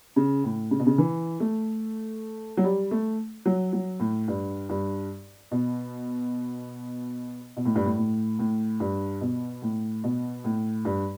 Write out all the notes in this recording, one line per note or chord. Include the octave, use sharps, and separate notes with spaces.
C#3
A2
C#3
B2
C#3
E3
A3
F#3
G3
A3
F#3
F#3
A2
G2
G2
B2
B2
A2
G2
A2
A2
A2
G2
B2
A2
B2
A2
G2